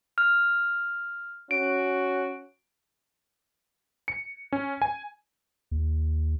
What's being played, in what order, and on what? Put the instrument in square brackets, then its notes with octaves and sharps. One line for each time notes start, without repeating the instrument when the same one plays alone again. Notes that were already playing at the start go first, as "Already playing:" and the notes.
[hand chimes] F6
[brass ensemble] C#4 F#4 [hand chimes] D7
[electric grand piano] C#7
C#4
G#5
[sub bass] D#2